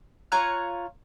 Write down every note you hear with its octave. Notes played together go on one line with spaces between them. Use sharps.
F4 C#5 A#5 F#6